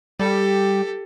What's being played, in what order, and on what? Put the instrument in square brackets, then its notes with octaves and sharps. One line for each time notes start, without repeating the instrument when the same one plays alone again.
[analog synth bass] G3 [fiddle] G4 A4